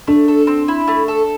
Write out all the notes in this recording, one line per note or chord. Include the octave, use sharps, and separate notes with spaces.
A3 D4
A4
C4
E4
A3
A4